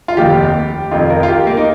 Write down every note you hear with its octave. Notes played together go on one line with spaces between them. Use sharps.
F4
F1 D#2 D#3 G4
F1 F2 D#3 F4
A#4
F4
G4
A#3
D#4